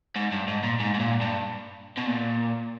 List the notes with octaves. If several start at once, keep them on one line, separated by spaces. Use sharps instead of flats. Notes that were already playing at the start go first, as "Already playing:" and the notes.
G#2
G2
G#2
A#2
G#2
G#2
A#2
G2
B2
A#2